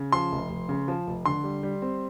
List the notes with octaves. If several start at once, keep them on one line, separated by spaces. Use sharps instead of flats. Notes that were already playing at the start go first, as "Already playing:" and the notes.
Already playing: C#3
F3 C6
F1
F1
C#3
F3
F1
D3 C6
G3
G3
C4